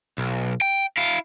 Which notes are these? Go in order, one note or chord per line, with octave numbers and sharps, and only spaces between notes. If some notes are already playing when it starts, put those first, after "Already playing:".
B1
G5
E4 F5